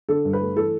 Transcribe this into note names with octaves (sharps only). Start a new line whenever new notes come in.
D3 A4
G2
B4
A3
E3 A4